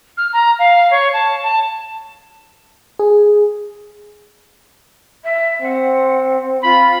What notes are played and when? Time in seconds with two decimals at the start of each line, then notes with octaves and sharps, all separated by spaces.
0.17 F6
0.33 A#5
0.59 F5
0.91 C#5
1.13 A5
1.43 A5
2.99 G#4
5.24 E5
5.62 C4 F#5
6.63 F4 B5